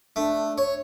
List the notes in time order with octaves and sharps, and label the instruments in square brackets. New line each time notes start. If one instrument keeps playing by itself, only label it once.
[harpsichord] A3 [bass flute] D4
[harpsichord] C#5